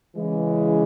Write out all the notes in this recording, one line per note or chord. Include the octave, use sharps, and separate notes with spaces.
C#3 E3 G#3